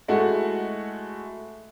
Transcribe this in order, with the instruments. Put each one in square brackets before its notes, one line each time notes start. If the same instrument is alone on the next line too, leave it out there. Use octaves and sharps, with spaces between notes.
[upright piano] G#3 A3 E4 F#4